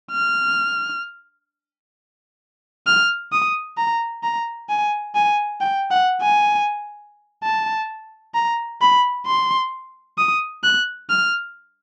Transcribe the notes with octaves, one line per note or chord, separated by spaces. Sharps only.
F6
F6
D#6
A#5
A#5
G#5
G#5
G5
F#5
G#5
A5
A#5
B5
C6
D#6
F#6
F6